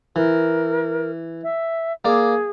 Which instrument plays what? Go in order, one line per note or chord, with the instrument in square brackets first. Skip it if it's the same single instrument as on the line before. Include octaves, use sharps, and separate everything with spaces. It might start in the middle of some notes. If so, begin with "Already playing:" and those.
[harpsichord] E3 [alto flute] A#4
[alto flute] E5
[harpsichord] A#3 D5 [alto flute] G#4